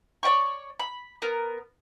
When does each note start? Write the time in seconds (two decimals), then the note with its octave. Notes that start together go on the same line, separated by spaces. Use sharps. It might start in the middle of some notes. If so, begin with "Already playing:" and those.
0.23 C#5 D5 G5 C#6
0.80 B5
1.22 B3 A#4